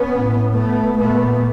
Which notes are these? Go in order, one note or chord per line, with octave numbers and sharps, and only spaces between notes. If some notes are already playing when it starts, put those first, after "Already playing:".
Already playing: B3 C#4
A2
A3 B3
A#2 A3 B3